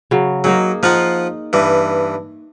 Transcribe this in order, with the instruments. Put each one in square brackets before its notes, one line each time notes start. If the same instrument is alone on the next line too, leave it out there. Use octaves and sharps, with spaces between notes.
[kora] C#3 F#3
[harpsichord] F#3 [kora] A#3 D#4 G#4
[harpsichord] F3 F4 F#5 [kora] D#4
[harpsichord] G2 E3